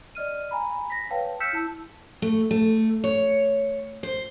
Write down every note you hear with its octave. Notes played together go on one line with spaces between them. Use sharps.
D5 D#5 F6 D#7
G#5 A#5 B5
A#6 B6
B4 C#5 F5 G5 A5
E6 F6 G6 B6 C#7 E7
E4 A5 E6
A3
A3
C#5
C5